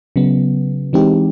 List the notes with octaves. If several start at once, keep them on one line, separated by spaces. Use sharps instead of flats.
C#3 F#3 B3
E3 G#3 C4 D#4 G4